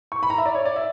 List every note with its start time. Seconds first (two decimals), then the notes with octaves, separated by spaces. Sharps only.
0.12 C#6
0.23 B5
0.30 A#5
0.38 E5
0.46 D5
0.55 C#5
0.65 D5
0.76 E5